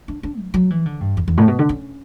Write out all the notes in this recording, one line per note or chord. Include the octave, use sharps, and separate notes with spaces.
D4
D4
F#3
F#3
E3
D3
G2
E2
E2
A2
B2
D3
C#4